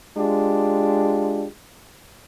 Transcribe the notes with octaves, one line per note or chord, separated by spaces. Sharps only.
G#3 D4 F4 G4